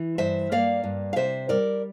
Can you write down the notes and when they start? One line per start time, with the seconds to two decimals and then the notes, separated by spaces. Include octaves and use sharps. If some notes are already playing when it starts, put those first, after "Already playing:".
Already playing: E3
0.18 G2 C5 E5
0.51 A#3 D5 F5
0.84 G2
1.13 F5
1.16 C3 C5 E5
1.49 G3 A#4 D5